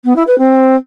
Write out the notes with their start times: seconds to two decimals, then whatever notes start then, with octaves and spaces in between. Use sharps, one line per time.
0.05 B3
0.16 E4
0.27 B4
0.38 C4